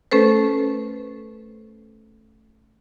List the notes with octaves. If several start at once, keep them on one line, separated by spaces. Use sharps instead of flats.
A3 C#4 A4 B4 C5